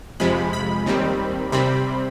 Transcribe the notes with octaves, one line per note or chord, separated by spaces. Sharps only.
F2 C3 F3 G#3 B5
B5
D#2 D#3 G3 C4
C3 G3 C4 B5